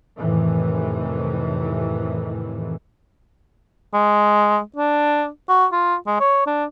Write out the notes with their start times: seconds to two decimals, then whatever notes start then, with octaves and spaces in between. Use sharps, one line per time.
0.19 F2 A2 C3 D#3 E3
3.94 G#3
4.76 D4
5.49 F#4
5.72 F4
6.07 G#3
6.20 C#5
6.46 D4